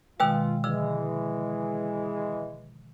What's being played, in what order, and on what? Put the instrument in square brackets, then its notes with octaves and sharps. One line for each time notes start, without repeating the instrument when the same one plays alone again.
[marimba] B2 D#3 G#3 [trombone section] F4 [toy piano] B4 G5 E6
[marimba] D3 F3 [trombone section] E3 G#3 [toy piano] E6